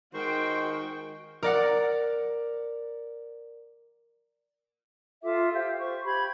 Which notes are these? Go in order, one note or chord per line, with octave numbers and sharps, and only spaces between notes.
D#3 G#3 F#4 C5 G5 C#6
A#4 D5 F#5
F4 A4 E5 D6
G4 C5 F5
C5 C#6
G4 B5 G#6